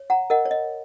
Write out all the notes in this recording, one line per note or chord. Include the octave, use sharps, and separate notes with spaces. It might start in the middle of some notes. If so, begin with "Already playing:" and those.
Already playing: C#5
F#5 A#5
A#4 D#5 F#5
C#5
D#5